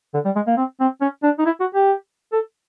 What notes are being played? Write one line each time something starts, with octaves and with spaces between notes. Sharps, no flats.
D3
G3
G#3
A#3
C4
C4
C#4
D4
D#4
E4
F#4
G4
A4